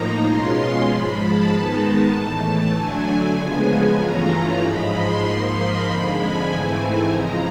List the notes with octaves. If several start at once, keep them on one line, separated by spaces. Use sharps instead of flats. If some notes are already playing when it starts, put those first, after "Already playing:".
Already playing: A2 F3 A#3 D#4 A#5
B2 G#3 C#4 F4 C6
G#2 F3 G#3 B5
A5
D#3 G#3 B3 D#4
A5
A2 E3 A3
A5
D3 F#3 A3 D4 G#5
C#3 F3 G#3 B3 G#5
G2 E3 A3 C#4 F4 A#5
G#2 F3 G#3 B5
C6
G#2 F3 A#3 D#4
B5
F2 D3 F3 G#3
G#5
G#2 E3 A3 C4 E4
G#5
C#3 F3 G#3 A#5